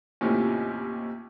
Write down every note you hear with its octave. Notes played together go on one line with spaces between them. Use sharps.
D#2 A2 C3 F3 C#4